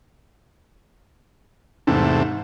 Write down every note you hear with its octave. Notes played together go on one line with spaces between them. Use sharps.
E2 G#2 C3 A3